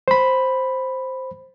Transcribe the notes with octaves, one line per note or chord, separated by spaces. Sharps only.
C5 B5